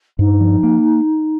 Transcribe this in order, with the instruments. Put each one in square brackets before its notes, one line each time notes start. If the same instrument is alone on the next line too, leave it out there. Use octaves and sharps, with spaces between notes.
[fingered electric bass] G2 [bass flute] D#4
[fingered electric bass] F3
A#3